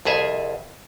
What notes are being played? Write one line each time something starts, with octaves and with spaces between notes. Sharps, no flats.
C2 F2 G#4 E5 G#5